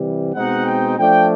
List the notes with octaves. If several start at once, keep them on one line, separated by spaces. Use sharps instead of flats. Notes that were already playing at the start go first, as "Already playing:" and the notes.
Already playing: C3 E3 G3
B2 G#3 C4 D#4 F#5
G5
F3 A3 D4 G5